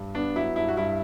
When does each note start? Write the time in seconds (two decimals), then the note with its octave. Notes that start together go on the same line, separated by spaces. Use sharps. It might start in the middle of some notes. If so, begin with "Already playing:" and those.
Already playing: G2
0.15 B3 D4
0.36 F#3 E4
0.56 G2 E4
0.68 F#4
0.76 G2 E4